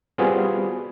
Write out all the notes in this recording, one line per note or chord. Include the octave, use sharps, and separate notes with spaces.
G3 B3 C4 F4 F#4 G#4